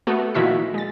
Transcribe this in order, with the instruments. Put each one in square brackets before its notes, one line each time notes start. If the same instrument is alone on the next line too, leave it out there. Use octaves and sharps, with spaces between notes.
[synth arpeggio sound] A3 B3 F#4
A#2 D#3 F3 E4 F#4 B6
G#3 A6